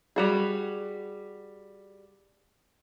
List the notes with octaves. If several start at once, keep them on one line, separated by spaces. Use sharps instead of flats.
G3 F#4 G#4